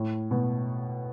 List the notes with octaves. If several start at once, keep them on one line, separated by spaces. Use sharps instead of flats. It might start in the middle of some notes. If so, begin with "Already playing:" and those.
Already playing: A2
B2